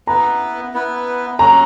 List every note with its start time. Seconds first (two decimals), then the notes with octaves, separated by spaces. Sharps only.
0.07 B3 E4 B4 A#5
0.74 B3 E4 B4
1.39 F#3 C#4 F#4 A#5